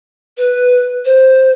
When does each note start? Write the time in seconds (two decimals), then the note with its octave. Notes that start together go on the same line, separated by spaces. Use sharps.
0.37 B4
1.05 C5